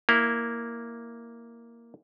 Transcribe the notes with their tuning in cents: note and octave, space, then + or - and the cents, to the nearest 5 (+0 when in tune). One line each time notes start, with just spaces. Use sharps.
A#3 +0 E4 +0